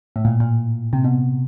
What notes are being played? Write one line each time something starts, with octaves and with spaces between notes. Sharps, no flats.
A2
A#2
A#2
C3
B2